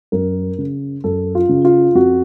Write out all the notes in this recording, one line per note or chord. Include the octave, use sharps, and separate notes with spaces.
F#2 A#4
C#3
F#2 A4
F4
C#3
F4
F2 F#4